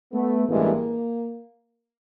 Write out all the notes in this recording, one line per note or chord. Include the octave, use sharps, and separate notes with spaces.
A3 B3
A1 G2 E3 G#3 A#3